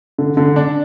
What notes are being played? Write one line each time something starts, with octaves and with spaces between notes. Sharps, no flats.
D3
D3
D4